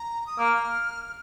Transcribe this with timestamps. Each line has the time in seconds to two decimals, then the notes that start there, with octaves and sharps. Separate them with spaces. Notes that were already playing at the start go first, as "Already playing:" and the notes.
Already playing: A#5
0.27 D#6
0.39 A#3 F6